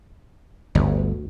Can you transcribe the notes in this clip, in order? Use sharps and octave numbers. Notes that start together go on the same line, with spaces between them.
G1 D2